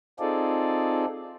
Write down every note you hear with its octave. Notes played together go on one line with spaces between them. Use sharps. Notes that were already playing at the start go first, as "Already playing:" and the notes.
C4 D#4 F4 G#4 A4 D5